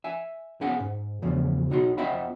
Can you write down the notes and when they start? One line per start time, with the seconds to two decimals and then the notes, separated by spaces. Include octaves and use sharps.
0.04 E5 G#5
0.61 B3 C#4 G#4 F5 F#5 G#5
0.80 G#2
1.22 E2 A2 C#3 F3
1.70 B1 D#4 F#4 C6
1.97 C4 F4 D#5 E5 F#5 B5